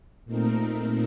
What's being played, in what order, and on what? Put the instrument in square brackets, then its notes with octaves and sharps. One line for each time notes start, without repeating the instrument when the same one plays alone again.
[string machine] A#2 A3 C4 D#4 A#4